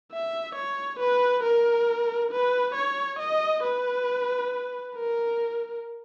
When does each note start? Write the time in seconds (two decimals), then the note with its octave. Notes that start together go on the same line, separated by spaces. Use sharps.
0.12 E5
0.55 C#5
0.99 B4
1.43 A#4
2.31 B4
2.75 C#5
3.19 D#5
3.63 B4
4.95 A#4